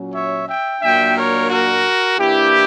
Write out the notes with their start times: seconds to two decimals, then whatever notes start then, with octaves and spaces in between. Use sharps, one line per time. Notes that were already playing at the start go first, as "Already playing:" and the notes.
Already playing: A#2 F#3 C#4
0.13 C#5 E5
0.47 E5 G5
0.81 A#2 F#3 A#3 D4 E5 G5
1.15 A#4 C#5
1.49 F#4 A#4
2.17 E3 A#3 D4 E4 G4